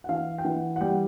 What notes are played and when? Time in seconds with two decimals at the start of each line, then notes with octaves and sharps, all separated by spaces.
0.04 F#5
0.09 E3 F5
0.38 G5
0.45 E3 F#5
0.76 F#5
0.81 G3 G5